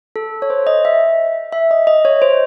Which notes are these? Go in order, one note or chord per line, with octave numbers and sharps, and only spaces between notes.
A4
C#5
C5
D#5
E5
E5
D#5
D#5
C#5
C5